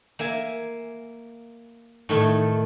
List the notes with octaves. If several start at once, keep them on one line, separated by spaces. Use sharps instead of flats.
A#3 E5 G#5
A2 D#3 A3